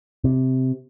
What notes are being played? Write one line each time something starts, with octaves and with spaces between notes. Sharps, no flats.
C3